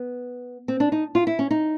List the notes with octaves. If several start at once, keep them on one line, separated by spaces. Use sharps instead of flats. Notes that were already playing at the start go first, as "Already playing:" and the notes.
Already playing: B3
C4
D4
D#4
F4
E4
C#4
D#4